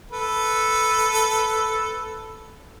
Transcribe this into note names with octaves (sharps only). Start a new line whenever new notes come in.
A4 B4